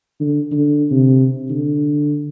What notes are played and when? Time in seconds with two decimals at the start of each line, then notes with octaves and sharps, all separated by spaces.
0.20 D3
0.51 D3
0.91 C3
1.50 D3